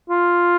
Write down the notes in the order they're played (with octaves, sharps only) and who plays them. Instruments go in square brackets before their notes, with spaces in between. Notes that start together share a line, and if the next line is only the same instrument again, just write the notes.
[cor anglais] F4